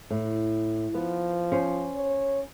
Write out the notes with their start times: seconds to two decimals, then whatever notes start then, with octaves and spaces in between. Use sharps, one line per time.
0.10 A2
0.94 F3 B3
1.52 C#4 C5
1.96 C#5